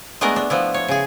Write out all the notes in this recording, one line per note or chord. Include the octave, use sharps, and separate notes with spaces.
G#3 A3 B3 D4 A#4 D#5
D4
F3 B3 E4
C#5
C#3 G#4